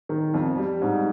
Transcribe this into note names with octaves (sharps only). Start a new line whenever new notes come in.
D#3
F2
G3
G#2